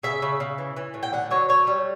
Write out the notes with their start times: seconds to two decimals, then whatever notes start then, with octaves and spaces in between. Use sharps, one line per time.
0.03 C#3 E5
0.22 C#3
0.40 C#3
0.58 E3
0.76 E3
0.94 A2
1.03 G5
1.13 D3 F#5
1.31 F#3 C#5
1.49 A3 C#5
1.67 G3